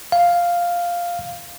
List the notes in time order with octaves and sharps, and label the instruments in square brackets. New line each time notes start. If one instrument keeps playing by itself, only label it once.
[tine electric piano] F5